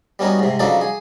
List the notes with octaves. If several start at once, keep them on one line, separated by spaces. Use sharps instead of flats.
G3 B3 C#4 D#4 F#4
G#2 C3
C#3 F3 F#3 D4 D#4 A4
G#4